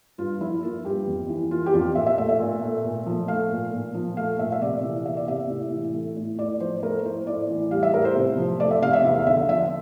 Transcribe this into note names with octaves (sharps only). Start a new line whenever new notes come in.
G2 F4
F3 E4
A#3 F4
G2 G4
F2
E3
A#3 F4
G4
F2 F4
A#2 E5
E5
A3 E5
E5
A#2
A3
A#2
F3
A3 F5
A#2
A#2
F3
A3 F5
A#2 E5
E5
C3 D5
E3
A#3 E5
D5
C3 E5
A2
E3
A3
A2
A2 D5
F3 C5
A3 A#4
A2 C5
A2 D5
E3
G3 F5
E5
A2 A#4
C5
C3
F3
A3 D5
E5
C3 F5
E5
E2 E5
F5
D3 E5
F3 E5